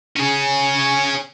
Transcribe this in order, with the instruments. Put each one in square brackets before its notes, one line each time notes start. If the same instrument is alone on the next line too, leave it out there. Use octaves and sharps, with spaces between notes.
[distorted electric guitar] C#4 G#4